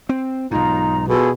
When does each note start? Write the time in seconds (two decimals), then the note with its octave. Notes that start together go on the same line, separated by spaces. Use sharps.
0.09 C4
0.51 B1 G#2 D#4 F4 A#5
1.09 B2 F4 G#4 A4